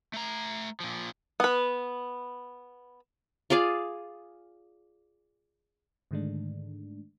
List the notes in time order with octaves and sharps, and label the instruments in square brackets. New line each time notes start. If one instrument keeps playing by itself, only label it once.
[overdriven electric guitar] A3 A#5
A#2 F3
[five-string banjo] B3 B4
[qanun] F4 G#4 D5 F5
[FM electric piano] G#2 D3 D#3 G#3 A3 D4